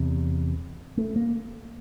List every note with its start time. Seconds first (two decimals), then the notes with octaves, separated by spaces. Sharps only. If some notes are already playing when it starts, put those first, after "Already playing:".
Already playing: E2 C3
0.97 A3
1.16 A#3